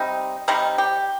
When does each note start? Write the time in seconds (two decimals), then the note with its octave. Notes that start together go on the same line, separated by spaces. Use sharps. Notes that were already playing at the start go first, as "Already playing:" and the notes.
Already playing: C3 G3 C4 D#4
0.48 C3 G3 C4 D#4
0.78 G4